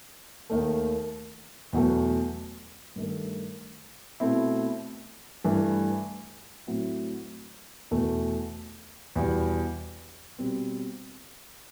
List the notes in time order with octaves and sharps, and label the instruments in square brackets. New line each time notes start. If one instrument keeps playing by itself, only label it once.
[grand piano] D#2 D#3 A3
E2 B2 F#3 A3
G2 D#3 A3
B2 A3 C4 E4
G2 E3 A3
A2 F#3 C4 E4
E2 B2 A3
E2 B2 G3
B2 G3 C4